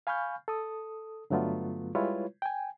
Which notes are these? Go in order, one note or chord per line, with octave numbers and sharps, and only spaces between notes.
F5 G#5 B5 C#6 F6 G6
A4 D#6
G2 D3 F#3 A3 B3 F4
G3 G#3 E4 F4 B4 C#5
G5 G#5